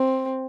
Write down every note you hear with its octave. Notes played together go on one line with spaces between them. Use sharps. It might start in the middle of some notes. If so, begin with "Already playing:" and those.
Already playing: C4